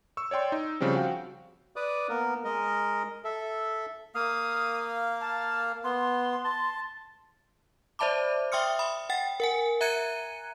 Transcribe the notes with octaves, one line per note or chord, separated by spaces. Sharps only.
C#6 E6
C#5 D5 G5 C6
D#4
C#3 F3 G3 C4
F#4 F5 G5
B4 D5 D6 D#6
A#3 B3 A#4
G#3 A#4 D#5
A4 E5
A#3 F5 D#6
A5
B3 C6
A5
C5 D5 E5 A5 B5 D6
E5 G5 C6 D#6 F6 C#7
B5 D#6
F#5 G5 A6
A#4 F#5 G#5
E5 A#5 F#6 G#6 C#7 D#7